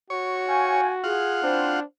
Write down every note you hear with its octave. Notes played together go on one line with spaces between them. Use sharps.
F#4 C#5
F5 G5 G#5
F4 G#4 F#5
C4 D4 E4 C5